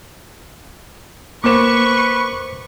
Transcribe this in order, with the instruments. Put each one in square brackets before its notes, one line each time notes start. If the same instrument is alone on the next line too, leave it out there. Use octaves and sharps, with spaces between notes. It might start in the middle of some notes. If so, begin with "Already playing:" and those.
[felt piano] A#3 E7 [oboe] B4 [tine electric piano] C5 D6 [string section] C#6